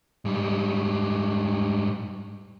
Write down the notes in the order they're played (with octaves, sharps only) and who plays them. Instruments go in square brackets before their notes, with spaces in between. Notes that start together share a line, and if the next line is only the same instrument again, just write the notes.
[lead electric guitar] G#2 G3